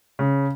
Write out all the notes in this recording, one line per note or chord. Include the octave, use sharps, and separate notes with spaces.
C#3